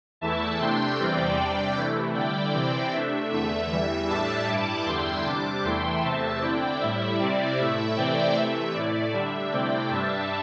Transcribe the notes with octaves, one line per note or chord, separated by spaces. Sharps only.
E2 E3 A3 E4 E5 A5
C3 A3 D4 G5 C6
E2 C3 E3 G3 C4 D5 G5
C3 G3 D4
C3 E3 A3 E4
D3 G3 E4 D5 G5
C3 E3 C4 E4
C3 A3 D4 E5
E2 D3 A3 E5
E2 E3 G3 E5
A2 G3 D4 E5 A5
G2 G3 E4 A5 D6
E2 D3 G3 E4 G5 C6
C3 G3 D4 A5 D6
E2 E3 A3 E4 G5 C6
E2 C3 A3 C4 E5 A5
D3 C4 E4 D5 G5
A2 G3 E4 E5
C3 G3 C4 E4 D5
A2 A3 E4 E5
C3 E3 A3 C4 E4 D5 G5
C3 E3 A3 E5
A2 A3 E4 D5
D3 G3 D4 E5
C3 A3 C4 E4 D5 G5
G2 G3 D4 E5 A5